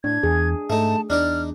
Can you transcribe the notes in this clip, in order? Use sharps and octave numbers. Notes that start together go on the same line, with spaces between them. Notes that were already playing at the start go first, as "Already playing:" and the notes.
A2 D4 G#6
E2 G#4
G#2 A3 D#4 A5
E2 D4 D#4 D5 F6